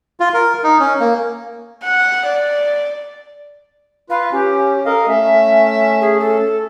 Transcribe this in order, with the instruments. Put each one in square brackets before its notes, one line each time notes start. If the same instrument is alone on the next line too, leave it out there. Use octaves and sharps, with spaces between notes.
[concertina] F4
A#4
D#4
C#4
A#3
[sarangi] F#5
D5
[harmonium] F4 B4 [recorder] F5
[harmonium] C#4 [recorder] G4
[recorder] A4 [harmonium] A#4 D#5 F5
[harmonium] A3 C#4 [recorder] E5
[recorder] G#4
A4